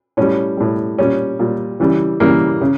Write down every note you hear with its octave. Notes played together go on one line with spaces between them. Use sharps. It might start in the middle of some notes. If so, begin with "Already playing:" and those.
A2 G3 C#4
A2 G3
A#2 G3 C#4
A#2 G3
C#3 E3 G3
C#3 E3 G3 A#3
C#3